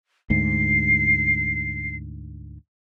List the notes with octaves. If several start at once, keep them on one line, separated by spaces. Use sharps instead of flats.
D2 G#2 C7